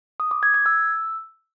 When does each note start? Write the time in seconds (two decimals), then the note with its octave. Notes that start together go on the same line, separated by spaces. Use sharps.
0.20 D#6
0.31 D6
0.43 G#6
0.54 G#6
0.66 E6